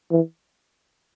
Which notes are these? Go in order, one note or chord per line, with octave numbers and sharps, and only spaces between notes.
E3